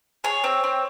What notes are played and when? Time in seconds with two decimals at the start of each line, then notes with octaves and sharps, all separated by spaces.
0.24 G#4 C#5
0.44 C4
0.64 C4